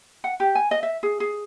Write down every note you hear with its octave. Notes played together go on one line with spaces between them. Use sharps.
F#5
G4
G#5
D#5
E5
G#4
G#4